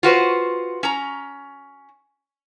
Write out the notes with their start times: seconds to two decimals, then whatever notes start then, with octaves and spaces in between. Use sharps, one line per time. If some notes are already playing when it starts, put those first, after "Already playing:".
0.03 F4 F#4 B4 C5
0.83 C#4 A#5